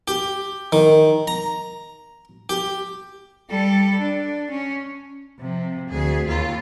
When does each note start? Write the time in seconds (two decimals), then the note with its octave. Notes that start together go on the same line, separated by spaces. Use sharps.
0.08 G4
0.72 D#3
1.27 A#5
2.49 G4
3.50 G3 A4
4.00 D4
4.50 C#4
5.39 C3 F3
5.89 D2 G#4
6.28 D#2 F4